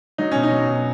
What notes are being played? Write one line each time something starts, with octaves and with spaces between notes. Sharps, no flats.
F#3 D#4
B2 C#4
D#4
F#3
B2